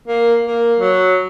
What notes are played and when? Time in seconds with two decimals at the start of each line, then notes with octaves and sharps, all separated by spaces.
0.08 A#3
0.47 A#3
0.79 F#3